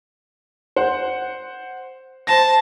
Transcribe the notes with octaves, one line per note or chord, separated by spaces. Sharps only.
C5 F#5
C5 A5 A#6